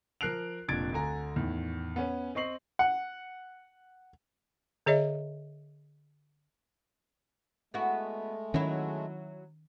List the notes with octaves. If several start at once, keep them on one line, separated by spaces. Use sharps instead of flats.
F3 A#4 F#6 C7 D7 F7
F1 A#2 D4 G#6 A6 D7
D2 D3 G#5 A#5
E2 A2 D#3
B3 C#4
C4 D#5 C#6 C7 F#7
F#5
D3 G#4 C#5 D#5 E5
G#3 A3 B3 E4 F#4
D#3 F#3 C#4 E4